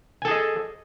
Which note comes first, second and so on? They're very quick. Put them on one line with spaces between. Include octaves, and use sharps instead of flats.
G#5 A4 G#4 D#5